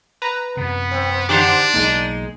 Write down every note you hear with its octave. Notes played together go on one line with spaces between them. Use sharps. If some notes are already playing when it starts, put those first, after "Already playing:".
B4 A#5
F#2 C3 B3
C4
D3 D4 G4 C5 F#5 D6
B1 G#3 A#3 D#4